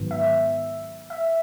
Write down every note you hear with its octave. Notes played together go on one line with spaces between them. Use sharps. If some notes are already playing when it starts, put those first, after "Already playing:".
Already playing: G#2 D#3 F#3 B3
E5
E5